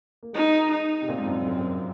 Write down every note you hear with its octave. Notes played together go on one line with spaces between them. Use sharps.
A#3
G#3 D#4
D#4
C3
A#2 C4
G#2
F2
F#2
F#2
F#2